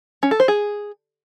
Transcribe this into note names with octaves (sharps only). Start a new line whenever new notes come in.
C#4
A4
C5
G#4